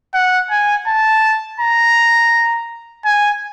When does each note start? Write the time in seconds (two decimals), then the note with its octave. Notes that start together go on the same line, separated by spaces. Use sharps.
0.14 F#5
0.51 G#5
0.87 A5
1.60 A#5
3.05 G#5